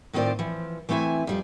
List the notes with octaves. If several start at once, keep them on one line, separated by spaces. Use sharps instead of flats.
A2 D#3 C4 F4 C5 D5
E3 F3
E3 A3 C4 E4 G#5
F2 G3 F4